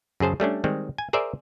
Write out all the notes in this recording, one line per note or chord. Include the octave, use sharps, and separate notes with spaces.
F#2 C#3 G#4 C5 A5
G3 A3 C#4 D4
D#3 G3 G#3 C4
G#5
G#4 A#4 C5 D5 E5